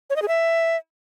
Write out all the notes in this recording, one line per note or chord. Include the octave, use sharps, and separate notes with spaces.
C#5
D#5
G#4
E5